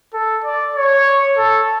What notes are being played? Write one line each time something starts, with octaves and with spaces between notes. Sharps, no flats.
A4
D5
C#5
A4